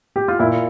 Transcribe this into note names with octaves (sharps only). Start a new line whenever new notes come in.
G4
F4
A#2 E4